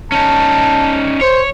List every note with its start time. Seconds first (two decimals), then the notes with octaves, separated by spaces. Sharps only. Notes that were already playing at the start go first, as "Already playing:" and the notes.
0.12 C#4 D#4 A5
1.21 C5 C#5